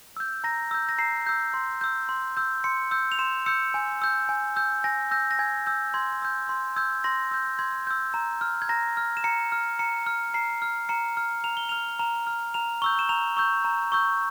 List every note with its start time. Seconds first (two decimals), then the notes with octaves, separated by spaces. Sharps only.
0.17 E6 G6
0.44 A#5 A#6
0.71 E6 G6
0.89 A#6
0.98 A#5 C7
1.26 E6 G6
1.54 C6
1.81 E6 G6
2.09 C6
2.37 E6 G6
2.64 C6 C#7
2.91 E6 G6
3.12 F7
3.19 C6 E7
3.46 E6 G6 C#7
3.74 G#5
4.02 E6 G6
4.29 G#5
4.56 E6 G6
4.84 G#5 A#6
5.11 E6 G6 A#6
5.31 A#6
5.39 G#5 G#6
5.67 E6 G6
5.94 C6 G#6
6.22 E6 G6
6.49 C6
6.76 E6 G6 G#6
7.04 C6 A#6
7.31 E6 G6
7.59 C6 G#6
7.87 E6 G6
8.14 A#5
8.41 F6
8.62 G#6
8.69 A#5 A#6
8.97 F6
9.17 E7
9.24 A#5 C#7
9.52 F6
9.79 A#5 C#7
10.06 F6
10.34 A#5 C7
10.62 F6
10.89 A#5 C#7
11.17 F6
11.44 A#5 F7
11.57 G7
11.69 F6 F7
11.99 A#5 F7
12.27 F6
12.54 A#5 F7
12.82 C#6 E6 G6 G7
12.99 E7
13.09 A#5 F7
13.37 C#6 E6 G6
13.64 A#5
13.92 C#6 E6 G6